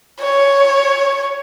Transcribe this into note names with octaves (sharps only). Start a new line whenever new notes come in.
C#5